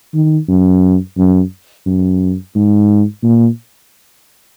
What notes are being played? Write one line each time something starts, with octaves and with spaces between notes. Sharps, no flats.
D#3
F#2
F#2
F#2
G#2
A#2